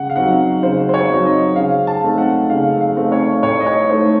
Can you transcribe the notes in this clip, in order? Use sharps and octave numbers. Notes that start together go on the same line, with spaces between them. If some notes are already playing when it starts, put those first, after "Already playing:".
Already playing: C#3 F#5
F5
F#3 C4 D#4 F#5
C#3 C5
C5
C#5
F#3 C4 D#4
D#5
C#3 F5
A5
A3 C4 D#4
F#5
C#3 F5
F5
A3 C4 D#4
C#5
A2 C#5
D#5
C#5
A3 D#4 C5